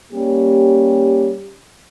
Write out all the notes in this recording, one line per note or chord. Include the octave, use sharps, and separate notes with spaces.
G3 A#3 C#4 G4